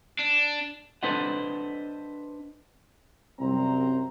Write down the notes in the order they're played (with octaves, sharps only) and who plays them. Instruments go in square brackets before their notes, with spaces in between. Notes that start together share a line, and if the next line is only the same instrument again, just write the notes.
[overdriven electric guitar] D4
[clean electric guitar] D4 A4 B4 C5 D#5 F#5
[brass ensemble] C2 F#2 C4 A#5